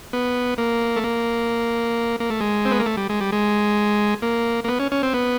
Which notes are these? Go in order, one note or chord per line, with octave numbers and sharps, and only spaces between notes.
B3
A#3
A3
A#3
A#3
A3
G#3
C4
B3
A#3
A3
G3
G#3
G3
G#3
A#3
A#3
B3
C#4
C#4
C4
B3